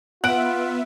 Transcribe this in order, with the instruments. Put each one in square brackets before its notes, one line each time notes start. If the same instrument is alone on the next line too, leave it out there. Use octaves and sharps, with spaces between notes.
[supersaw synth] B3 E5 [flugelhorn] F4 [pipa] F#5 [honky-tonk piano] F#6 D7